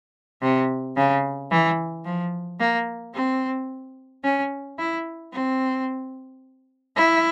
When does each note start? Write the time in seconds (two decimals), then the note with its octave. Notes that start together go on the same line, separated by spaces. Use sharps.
0.42 C3
0.96 C#3
1.51 E3
2.05 F3
2.60 A#3
3.15 C4
4.24 C#4
4.78 E4
5.33 C4
6.96 E4